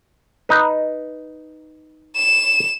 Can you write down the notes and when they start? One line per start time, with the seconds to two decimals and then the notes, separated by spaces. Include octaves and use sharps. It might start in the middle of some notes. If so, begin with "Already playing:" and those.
0.49 D#4 B4
2.16 E7